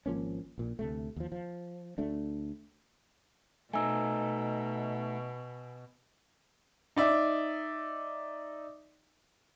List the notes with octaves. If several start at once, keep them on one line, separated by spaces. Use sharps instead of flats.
G#1 F3 A#3 C#4
A#1 A#2
D2 C3 A3
D#2 F3
F3
D2 A3 D4
B2 A3 D#4 G#5 E6
D#4 D5 E5